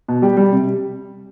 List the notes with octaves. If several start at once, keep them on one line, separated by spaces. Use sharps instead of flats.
B2
G3 G4
G3
C3